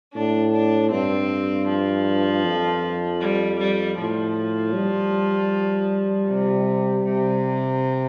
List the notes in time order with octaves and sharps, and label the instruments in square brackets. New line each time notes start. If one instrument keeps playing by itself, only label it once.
[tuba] A2 [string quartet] D4
[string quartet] D4
[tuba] G2 [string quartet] C4
[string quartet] F3
[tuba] F2
[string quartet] G3
G3
[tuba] A2 [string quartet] F3
[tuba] G3
[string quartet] C3
C3